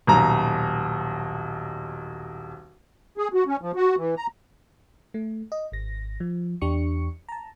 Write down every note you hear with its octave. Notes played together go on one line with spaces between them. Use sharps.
D#1 B1 A#5
G#4
F#4
C#4
F3
F#4
E3
A#5
A3
D#5
G#1 A#6
F3
E2 D4 G4 C#6 C#7
A5 A#5